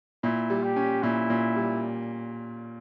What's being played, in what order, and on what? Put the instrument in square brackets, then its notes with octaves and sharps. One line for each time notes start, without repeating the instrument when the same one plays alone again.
[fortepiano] A#2 [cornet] E4
[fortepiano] G3
[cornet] G4
[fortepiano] C#4
[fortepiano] A#2 [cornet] E4
[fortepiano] A#2
G3